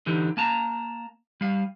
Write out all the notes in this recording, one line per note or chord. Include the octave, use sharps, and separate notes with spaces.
D3 E3 D#4 G4
A#3 A5 A#5
G3 F5